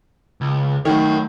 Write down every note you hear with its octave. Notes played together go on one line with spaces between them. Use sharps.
C#2
D#3 F#3 A3 C#5 G5